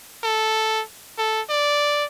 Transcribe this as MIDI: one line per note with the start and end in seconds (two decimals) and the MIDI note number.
0.24 0.81 69
1.18 1.41 69
1.49 2.05 74